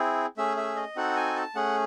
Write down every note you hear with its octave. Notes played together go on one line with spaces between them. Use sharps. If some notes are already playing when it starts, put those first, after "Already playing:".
Already playing: C4 E4 G#4
A3 C#4 G#4 E5
E5
D#5
C4 D#4 F#4 A4 F#5
G#5
A5
A3 C#4 G#4 F#5